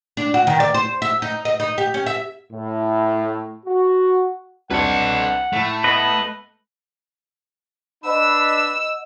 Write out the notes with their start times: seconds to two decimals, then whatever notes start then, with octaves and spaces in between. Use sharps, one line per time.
0.17 D4
0.34 F#4
0.47 D#3
0.60 D5
0.74 C5
1.02 E5
1.22 D#4
1.45 D#5
1.60 D#4
1.78 G4
1.94 C#4
2.06 E5
2.53 A2
3.66 F#4
4.71 C2 D4 B4 C#5 F#5
5.53 A2 A3
5.84 B3 B4 D#5
8.04 D4 B4 D#5 F#5 B5 E6